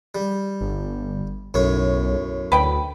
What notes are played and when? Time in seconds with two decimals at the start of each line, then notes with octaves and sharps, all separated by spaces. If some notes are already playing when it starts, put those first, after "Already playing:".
0.15 G3
0.61 G1
1.54 B1 F#2 A2 C#5
2.52 D2 B4 G5 B5